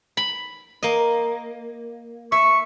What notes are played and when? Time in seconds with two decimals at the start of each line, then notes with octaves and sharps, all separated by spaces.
0.17 B5
0.83 A#3 D#5
2.32 E5 C#6